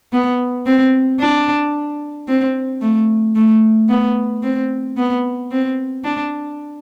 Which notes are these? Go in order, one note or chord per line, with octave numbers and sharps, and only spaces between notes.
B3
C4
D4
C4
A3
A3
B3
C4
B3
C4
D4